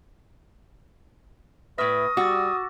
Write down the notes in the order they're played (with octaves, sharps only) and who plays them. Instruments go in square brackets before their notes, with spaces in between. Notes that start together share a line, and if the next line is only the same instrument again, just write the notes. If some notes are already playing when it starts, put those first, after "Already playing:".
[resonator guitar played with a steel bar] A2 E5 [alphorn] B4 [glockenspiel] C#6 F6 A#6 [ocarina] D#6
[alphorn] G3 [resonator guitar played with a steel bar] F#4 [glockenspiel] D6 E6 A6